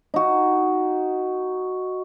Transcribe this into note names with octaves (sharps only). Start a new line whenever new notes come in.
D#4 F#4